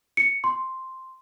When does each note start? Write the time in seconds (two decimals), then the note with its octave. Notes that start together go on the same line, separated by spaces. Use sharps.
0.17 C#7
0.44 C6